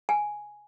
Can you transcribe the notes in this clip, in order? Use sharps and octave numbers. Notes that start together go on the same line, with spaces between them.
G#5